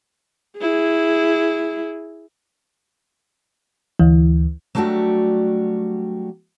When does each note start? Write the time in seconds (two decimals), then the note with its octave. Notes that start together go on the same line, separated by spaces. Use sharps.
0.58 E4 G#4
3.99 D2 E3
4.75 F#3 G3 A3 D4 F#4 G4